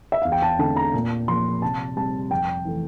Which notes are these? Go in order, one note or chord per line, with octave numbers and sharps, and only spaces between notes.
E5
E2 F5
G5
A5
D3 A3 C4 A5
A#5
A#2
F3 A#3 C6
C3 A5
G3 C4 A5
F2 G5
E3 A3